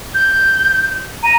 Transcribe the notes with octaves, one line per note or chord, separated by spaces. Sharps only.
G6
A#5 D#7